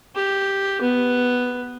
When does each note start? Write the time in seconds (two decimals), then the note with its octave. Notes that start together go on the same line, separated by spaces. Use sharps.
0.16 G4
0.82 B3